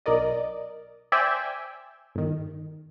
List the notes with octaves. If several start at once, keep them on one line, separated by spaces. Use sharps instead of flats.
B1 A#4 D5 D#5
C5 D5 E5 G5 G#5
G1 D#3